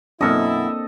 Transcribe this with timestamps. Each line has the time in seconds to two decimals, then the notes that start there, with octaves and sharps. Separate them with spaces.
0.21 F#2 B2 A#3 C4 D4 E4 A4 D#5